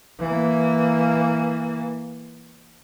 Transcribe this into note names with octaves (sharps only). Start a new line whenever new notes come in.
E3 A#3